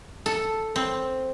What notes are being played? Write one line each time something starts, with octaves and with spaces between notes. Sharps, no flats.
A4
C4